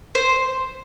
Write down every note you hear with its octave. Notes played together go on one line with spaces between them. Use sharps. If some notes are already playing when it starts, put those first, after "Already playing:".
C5